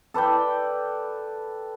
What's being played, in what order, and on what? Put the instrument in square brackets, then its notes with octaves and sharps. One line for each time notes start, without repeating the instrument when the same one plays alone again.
[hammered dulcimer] A4 B4 D5 G5